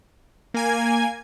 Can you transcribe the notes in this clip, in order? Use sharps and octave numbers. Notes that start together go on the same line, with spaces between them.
A#3 G#5 G#6